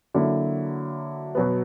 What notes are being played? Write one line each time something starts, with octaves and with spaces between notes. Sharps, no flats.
D3 F#3 A#3 E4
B2 F#3 B3